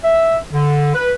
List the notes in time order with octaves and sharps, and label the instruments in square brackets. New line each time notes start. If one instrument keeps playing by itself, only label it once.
[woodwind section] E5
D3
B4